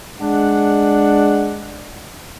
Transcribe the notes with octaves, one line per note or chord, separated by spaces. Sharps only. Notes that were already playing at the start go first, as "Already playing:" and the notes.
G#3 D4 F#5